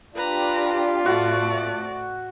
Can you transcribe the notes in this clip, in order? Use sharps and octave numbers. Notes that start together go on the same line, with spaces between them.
D4 F4 G4 B4 A#5
A2 A3 C4 F#4 D5